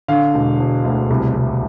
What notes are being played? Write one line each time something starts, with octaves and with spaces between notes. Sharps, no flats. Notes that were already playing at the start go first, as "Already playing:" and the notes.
D3 F5
E1
E1
D2
C2
C2